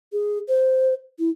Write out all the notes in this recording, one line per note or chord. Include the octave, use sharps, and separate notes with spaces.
G#4
C5
E4